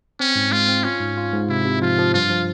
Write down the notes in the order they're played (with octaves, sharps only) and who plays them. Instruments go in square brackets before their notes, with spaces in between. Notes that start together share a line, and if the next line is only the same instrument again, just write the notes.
[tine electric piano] C4 [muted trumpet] C#4
[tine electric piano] G#2
[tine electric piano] G#3 [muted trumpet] F4
[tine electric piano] C4
[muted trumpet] C#4 [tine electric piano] F4
[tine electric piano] G#2
F4
G#2
[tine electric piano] C3 [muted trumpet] E4
[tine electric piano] C3
[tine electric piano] F3 [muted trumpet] F4
[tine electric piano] F3
[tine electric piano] G2 [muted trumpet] F4
[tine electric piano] F3